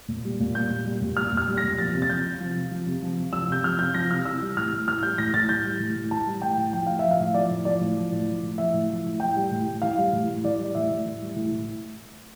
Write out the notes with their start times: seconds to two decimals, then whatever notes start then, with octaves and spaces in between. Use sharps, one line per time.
0.08 A#2
0.25 G3
0.40 A#2
0.54 G3 G6
0.70 A#2
0.85 G3
1.02 A#2
1.16 G3 F6
1.32 A#2
1.37 F6
1.48 G3
1.57 A#6
1.64 A#2
1.78 F3 A6
1.95 C3
2.02 A6
2.09 F3 G6
2.25 C3
2.40 F3
2.55 C3
2.71 F3
2.86 C3
3.02 F3
3.17 C3
3.33 F3 E6
3.48 C3 G6
3.64 F3 F6
3.79 C3 G6
3.94 F3 A#6
4.11 C3 F6
4.25 E3 E6
4.41 G3
4.57 A2 F6
4.72 A2
4.87 E3 F6
5.03 G3 G6
5.18 A2 A#6
5.34 A2 A6
5.49 E3 G6
5.65 G3
5.80 A2
5.96 A2
6.11 E3 A5
6.27 G3
6.42 A2 G5
6.58 A2
6.73 F3 G5
6.87 A2 F5
6.99 F3 E5
7.11 F5
7.20 A2
7.34 F3 D5
7.51 A2
7.65 F3 D5
7.81 A2
7.97 F3
8.12 A2
8.28 F3
8.43 A2
8.58 F3 E5
8.74 A2
8.90 F3
9.06 A2
9.20 E3 G5
9.36 G3
9.51 A2
9.67 A2
9.82 E3 F5
9.98 G3
10.13 A2
10.29 A2
10.44 E3 D5
10.59 G3
10.65 D5
10.75 A2 E5
10.90 A2
11.06 E3
11.22 G3
11.36 A2
11.52 A2